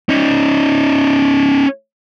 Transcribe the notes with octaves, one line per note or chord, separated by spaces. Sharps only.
C#4 D#4